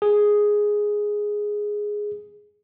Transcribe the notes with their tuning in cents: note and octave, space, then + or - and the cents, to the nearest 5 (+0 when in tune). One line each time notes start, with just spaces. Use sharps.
G#4 +0